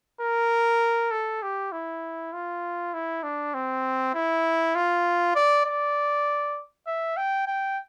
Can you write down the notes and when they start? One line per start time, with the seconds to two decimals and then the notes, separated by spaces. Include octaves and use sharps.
0.21 A#4
1.11 A4
1.42 G4
1.72 E4
2.33 F4
2.94 E4
3.23 D4
3.54 C4
4.14 E4
4.75 F4
5.35 D5
5.66 D5
6.87 E5
7.17 G5
7.47 G5